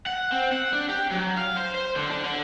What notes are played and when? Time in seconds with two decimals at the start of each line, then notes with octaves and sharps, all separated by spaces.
0.06 F#5
0.32 C4
0.52 F#5
0.73 D4
0.90 G4
1.12 F#3
1.37 F5
1.57 C5
1.75 C5
1.96 D3
2.10 D4
2.24 D3